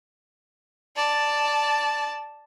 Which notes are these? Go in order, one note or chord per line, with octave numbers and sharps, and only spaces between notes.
D5 A5